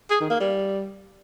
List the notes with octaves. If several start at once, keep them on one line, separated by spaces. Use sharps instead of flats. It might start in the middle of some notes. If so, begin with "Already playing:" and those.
G#4
D#3
A#3
G3